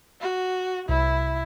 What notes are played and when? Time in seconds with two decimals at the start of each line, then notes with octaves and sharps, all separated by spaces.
0.21 F#4
0.89 C2 E4